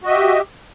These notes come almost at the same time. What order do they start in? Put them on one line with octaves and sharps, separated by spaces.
F#4 D#5 E5 G4